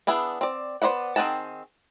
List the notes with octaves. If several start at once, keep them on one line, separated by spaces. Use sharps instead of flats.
B3 D4 E4 G#4
C4 D5
B3 C5 D5 E5 F#5
D#3 C4 G#4 F#5 A5